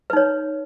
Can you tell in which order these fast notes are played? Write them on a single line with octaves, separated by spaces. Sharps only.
B4 D#4 C#5